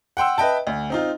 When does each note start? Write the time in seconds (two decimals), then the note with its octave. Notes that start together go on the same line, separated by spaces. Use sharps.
0.17 F#5 G5 C6 E6
0.38 B4 D#5 E5 G5 A5
0.67 D2
0.90 C4 D#4 F4